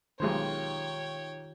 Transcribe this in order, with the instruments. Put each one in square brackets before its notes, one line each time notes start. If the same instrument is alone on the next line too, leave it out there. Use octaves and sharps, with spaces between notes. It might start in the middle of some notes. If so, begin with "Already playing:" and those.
[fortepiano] B1 G#3 C5 [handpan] D#3 F4 G4 [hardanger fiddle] C#5 G5